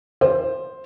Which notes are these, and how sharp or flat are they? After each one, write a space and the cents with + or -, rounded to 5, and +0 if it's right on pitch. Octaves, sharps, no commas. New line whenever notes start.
C5 +5